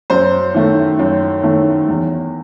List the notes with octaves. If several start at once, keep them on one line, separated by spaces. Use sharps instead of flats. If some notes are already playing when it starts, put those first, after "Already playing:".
F#2 C5
D#3 A3
F#2
D#3 A3
E2